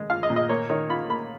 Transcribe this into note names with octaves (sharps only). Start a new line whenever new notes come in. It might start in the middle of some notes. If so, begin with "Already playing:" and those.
Already playing: G#3
F4 F5
D#5
A#2
D#5
A#3 C#5
D#3 C#5
F4 B5
A#3 B5